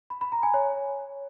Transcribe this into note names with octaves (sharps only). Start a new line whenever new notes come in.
B5
B5
A#5
G#5
C#5